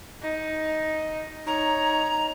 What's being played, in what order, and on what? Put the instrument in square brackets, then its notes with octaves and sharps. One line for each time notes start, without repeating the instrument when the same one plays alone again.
[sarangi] D#4
[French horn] D#4 [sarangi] C#5 [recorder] A#5